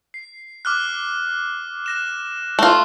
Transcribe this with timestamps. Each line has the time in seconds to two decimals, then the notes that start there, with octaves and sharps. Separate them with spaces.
0.14 C7
0.65 D6 F6 F#6
1.86 F#6 A#6 E7
2.59 A3 F4